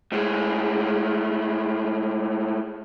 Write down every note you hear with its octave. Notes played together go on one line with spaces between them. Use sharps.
A2 G#3